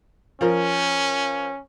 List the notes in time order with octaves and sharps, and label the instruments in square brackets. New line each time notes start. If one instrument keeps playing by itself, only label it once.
[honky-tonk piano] F3 A#4 [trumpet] C#4